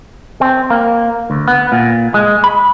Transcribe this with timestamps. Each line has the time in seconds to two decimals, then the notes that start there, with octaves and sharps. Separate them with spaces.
0.41 C4
0.70 A#3
1.30 D2
1.48 B3
1.72 A#2
2.14 G#3
2.44 B5